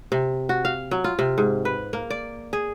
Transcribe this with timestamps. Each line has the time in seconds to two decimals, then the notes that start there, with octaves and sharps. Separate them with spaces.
0.12 C3
0.49 F#4
0.65 F5
0.91 F#3
1.04 F4
1.19 C3
1.38 G#2
1.65 B4
1.93 A#3
2.10 D5
2.53 G#4